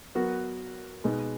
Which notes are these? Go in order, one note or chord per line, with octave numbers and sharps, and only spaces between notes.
F#3 B3 F#4 A#4
B2 G#3 B3 D#4